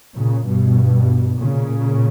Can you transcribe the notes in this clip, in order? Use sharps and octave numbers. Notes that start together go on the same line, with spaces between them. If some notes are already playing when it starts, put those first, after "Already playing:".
A#2 C#3
G2 B2
A#2 C#3